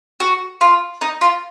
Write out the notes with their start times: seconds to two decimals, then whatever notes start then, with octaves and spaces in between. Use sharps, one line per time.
0.20 F#4
0.61 F4
1.01 D#4
1.21 F4